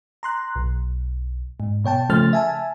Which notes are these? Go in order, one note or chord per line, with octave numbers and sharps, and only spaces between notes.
A#5 C6 F#6
B1
G#2
B2 C#5 G5 A5
C#3 F3 A3 C5 F6 A6
E5 G#5 A5